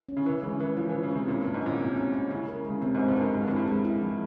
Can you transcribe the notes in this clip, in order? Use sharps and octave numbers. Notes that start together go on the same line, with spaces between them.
C#4
C#3
E3 E4
C#3 G#3
C#3
E3 C#4
F3 E4
E3 C#4
C#3
C3 G#3
A#2 C#4
G2 G3
G#2
A#2 C#4
C3 E4
C#4
C#4
C#3 E4
A#4
G#3
C#3
C3 C4
G#2 G#3
G2
G#2 A#4
G#2 G#3
G2
F2
E4
G2
G#3
E4
F3